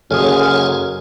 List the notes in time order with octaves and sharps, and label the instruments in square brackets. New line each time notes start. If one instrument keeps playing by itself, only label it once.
[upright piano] F#1 G#4 D#6 [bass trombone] F#2 [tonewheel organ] A4 C#5 G#5 [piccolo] F6